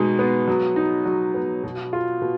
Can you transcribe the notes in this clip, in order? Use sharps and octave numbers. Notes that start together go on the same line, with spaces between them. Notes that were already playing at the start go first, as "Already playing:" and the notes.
Already playing: B2 G#3 D#4
B3
F#3
D#4
F#3
B3
B2
F4
B2